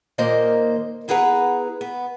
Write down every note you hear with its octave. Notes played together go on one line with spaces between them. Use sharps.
D#2 A#2 D#3 A#3 C5 D#5
B3 E4 G#4 B4 F#5 A#5
B3